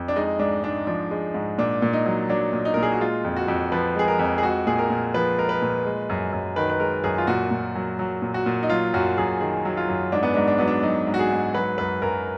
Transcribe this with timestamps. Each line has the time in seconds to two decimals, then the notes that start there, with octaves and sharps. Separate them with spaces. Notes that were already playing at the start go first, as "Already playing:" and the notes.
Already playing: F2
0.08 D4
0.16 G#3 D#4
0.39 G#2 D4
0.64 G#2 D4
0.87 F3 D4
1.11 G#3
1.34 G#2
1.58 A#2 D4
1.82 A#2
1.93 D#4
2.06 F#3
2.29 F#3 D4
2.53 A#2
2.65 D#4
2.74 A#2 A#4
2.83 G#4
2.92 F#4
3.00 G#3 F4
3.24 F2
3.36 F#4
3.48 F2
3.72 F3 B4
3.96 G#3 G#4
4.08 A#4
4.19 F2
4.38 G#4
4.43 G#3 F#4
4.67 A#2 G#4
4.79 A#4
4.90 A#2
5.14 F3 B4
5.38 G#3 A#4
5.49 B4
5.62 A#2
5.86 G#3
6.10 F#2
6.33 F#2
6.56 D#3 B4
6.70 B4
6.80 G#3 A#4
7.04 F#2 G#4
7.18 F4
7.27 A#2 F#4
7.51 A#2
7.75 F#3
7.99 F#3
8.22 A#2
8.34 F#4
8.46 A#2
8.63 D#4
8.70 F#3 F4
8.94 F#2 F#4
9.18 F#2 G#4
9.40 D#3 G#4
9.65 F#3
9.77 F4
9.88 F#2
10.12 G#2 D4
10.23 B3
10.34 G#2 D4
10.48 D4
10.58 F#3 B3
10.68 D4
10.83 F#3 D#4
11.07 G#2
11.14 F#4
11.19 G#4
11.31 G#2
11.54 F#3 B4
11.78 F#2 B4
12.02 F#2 A#4